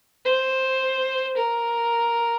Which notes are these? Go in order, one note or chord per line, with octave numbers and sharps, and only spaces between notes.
C5
A#4